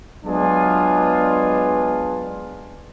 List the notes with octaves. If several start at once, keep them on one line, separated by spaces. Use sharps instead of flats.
F#3 G#3 B3 D4 F4 G#4